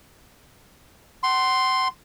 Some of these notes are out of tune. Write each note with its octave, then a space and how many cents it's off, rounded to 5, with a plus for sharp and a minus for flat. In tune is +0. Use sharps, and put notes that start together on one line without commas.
F#5 +35 C6 +0